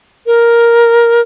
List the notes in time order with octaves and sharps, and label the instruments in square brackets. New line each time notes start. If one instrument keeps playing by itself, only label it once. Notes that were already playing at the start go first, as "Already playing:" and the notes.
[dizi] A#4